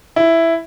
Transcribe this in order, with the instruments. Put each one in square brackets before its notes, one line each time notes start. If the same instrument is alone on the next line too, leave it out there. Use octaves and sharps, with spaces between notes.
[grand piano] E4